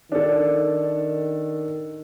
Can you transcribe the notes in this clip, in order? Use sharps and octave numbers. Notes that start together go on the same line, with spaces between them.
D#3 D4 A4